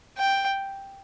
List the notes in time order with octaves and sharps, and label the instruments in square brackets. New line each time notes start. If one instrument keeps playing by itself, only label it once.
[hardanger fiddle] G5